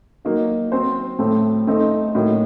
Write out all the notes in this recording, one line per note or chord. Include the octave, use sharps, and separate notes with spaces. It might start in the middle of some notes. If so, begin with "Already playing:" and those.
F#3 A#3 D#4 F#4
F#3 C4 F#4 C5
A2 A3 C4
A3 C4 D#4 A4
A2 F#3 A#3 D#4 F#4